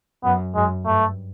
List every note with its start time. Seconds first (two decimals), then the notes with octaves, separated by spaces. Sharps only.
0.24 F#2 B3
0.55 F#2 G#3
0.86 G2 A3